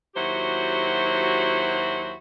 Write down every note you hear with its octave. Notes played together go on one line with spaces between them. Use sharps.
D#2 F#3 E4 F#4 G4 C5